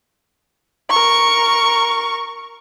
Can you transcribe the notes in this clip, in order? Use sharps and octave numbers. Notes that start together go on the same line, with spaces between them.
A#4 C#6